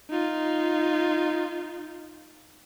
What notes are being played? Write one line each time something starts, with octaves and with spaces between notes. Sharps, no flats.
D#4 F4